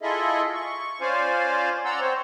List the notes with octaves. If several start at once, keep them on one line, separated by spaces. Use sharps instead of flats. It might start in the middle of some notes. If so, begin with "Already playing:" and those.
E4 F4 G#4 A4 D#5 E5
C#6
C#4 F4 C5 D5 F5 G#5
D5 F#5 A#5 C6 E6
C4 C5 C#5